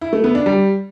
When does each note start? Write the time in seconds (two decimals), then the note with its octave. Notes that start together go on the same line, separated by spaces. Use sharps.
0.01 E4
0.13 A3
0.24 B3
0.35 D4
0.46 G3